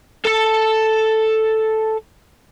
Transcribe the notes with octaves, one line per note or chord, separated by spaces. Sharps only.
A4 A5